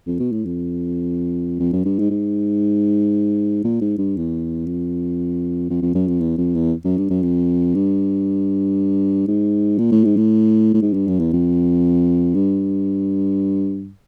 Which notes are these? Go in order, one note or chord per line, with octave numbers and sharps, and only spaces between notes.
F2
B2
A2
F2
F2
F#2
G2
G#2
G#2
A#2
G#2
G2
E2
F2
F2
F2
F#2
F2
E2
F2
E2
F#2
G2
F#2
F2
G2
G#2
A#2
A2
G#2
A2
A2
G#2
G2
F#2
E2
F2
G2